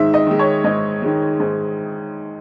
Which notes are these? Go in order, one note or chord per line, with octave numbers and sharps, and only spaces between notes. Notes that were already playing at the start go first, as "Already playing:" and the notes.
Already playing: G#2 D#3 G#3 E5
D#5
D#3 G#3
C#5
G#2 D#5
D#3 G#3
G#2